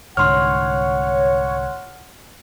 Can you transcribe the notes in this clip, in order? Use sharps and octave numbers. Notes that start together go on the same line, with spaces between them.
C2 G#2 D3 C#5 F#5 C6 F6